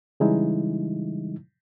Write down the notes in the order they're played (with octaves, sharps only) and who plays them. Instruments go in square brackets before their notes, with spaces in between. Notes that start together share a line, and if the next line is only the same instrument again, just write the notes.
[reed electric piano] C#3 E3 G3 G#3 D#4 E4